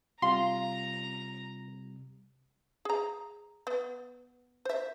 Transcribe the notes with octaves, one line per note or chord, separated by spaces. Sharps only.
C3 G3 F4 A#5 C6
G#4 A#5
B3
C5 E5